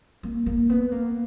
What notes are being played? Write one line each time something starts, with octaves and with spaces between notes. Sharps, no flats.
A#3
A#3
B3
A#3